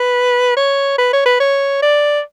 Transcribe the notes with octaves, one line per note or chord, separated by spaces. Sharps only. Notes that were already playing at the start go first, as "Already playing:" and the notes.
Already playing: B4
C#5
B4
C#5
B4
C#5
D5